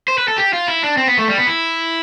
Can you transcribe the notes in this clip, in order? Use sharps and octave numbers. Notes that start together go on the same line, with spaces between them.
C5
B4
A4
G4
F4
E4
D4
C4
B3
A3
G3
B3
E4